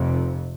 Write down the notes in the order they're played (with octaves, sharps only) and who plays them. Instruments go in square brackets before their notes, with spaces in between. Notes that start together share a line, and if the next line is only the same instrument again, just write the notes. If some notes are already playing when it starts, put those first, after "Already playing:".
Already playing: [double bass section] F1 F2 C3